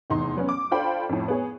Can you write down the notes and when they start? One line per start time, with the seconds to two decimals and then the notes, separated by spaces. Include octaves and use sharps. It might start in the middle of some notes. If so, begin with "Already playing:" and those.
0.10 F1 E2 D#4 C6
0.36 F#3 B3 C#4
0.49 D6
0.71 D4 F4 A4 C5 G5 B5
1.09 F2 A2
1.28 B3 G#4 C#5